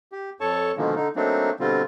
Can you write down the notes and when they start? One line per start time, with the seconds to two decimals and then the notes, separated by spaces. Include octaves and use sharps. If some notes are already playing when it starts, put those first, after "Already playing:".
0.12 G4
0.40 F2 A4 C#5 A5 C#6
0.77 B2 D3 D#3 F3 G#3 A#3
0.96 D3 D#4
1.16 F#3 A3 A#3 C4 D4 D#4
1.60 B2 D3 G3 C4 F4